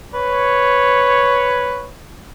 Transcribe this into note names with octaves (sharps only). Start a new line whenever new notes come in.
B4 C#5